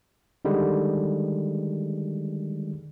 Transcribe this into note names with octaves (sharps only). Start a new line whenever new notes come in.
D3 D#3 G3 G#3